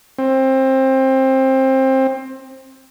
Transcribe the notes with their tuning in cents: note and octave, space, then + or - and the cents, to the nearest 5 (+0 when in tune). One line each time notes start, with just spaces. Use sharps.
C4 +20